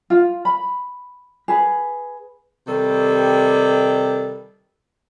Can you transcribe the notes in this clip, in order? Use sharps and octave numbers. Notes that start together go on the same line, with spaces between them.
F4
B5
G#4 B4
C3 D#3 G3 A4